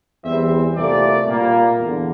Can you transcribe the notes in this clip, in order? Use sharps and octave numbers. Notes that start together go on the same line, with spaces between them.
E2 E3 G3 C4 E5
C2 A#2 A3 D5
A#2 G3 A#3
E2 D3